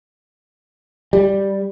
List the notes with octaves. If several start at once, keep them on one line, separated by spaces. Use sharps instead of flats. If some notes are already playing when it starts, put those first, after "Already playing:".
G3